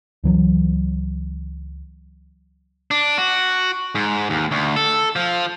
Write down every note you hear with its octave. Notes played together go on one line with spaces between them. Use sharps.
C#2 E3 F#3
D4
F#4
G#2
D#2
D2
A4
F3